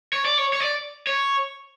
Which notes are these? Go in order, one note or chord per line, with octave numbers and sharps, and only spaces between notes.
C#5
D5
C#5
C#5
D5
C#5